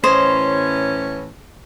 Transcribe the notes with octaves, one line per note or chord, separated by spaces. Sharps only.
A2 E3 C#4 C5 C#5 D#5